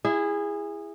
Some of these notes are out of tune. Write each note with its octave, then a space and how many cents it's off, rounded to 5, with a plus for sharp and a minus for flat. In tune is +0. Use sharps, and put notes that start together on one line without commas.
E4 +10 G#4 -20